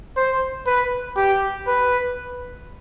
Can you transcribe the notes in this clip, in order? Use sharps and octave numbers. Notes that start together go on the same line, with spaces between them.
C5
B4
G4
B4